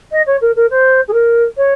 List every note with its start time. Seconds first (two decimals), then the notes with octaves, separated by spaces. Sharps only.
0.11 D#5
0.26 C#5
0.41 A#4
0.55 A#4
0.70 C5
1.08 G#4
1.13 A#4
1.57 C#5